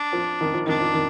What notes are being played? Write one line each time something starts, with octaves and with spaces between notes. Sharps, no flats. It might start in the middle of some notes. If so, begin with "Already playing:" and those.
Already playing: D4
F3
D#3
F3
D#3 D4
F3
D#3